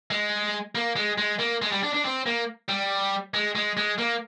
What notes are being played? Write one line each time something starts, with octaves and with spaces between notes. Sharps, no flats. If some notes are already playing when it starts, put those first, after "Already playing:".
G#3
A#3
G#3
G#3
A#3
G#3
G3
D4
D4
C4
A#3
G3
G#3
G#3
G#3
A#3